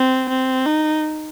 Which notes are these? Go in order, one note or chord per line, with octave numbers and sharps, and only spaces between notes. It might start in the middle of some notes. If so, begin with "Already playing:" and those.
Already playing: C4
C4
D#4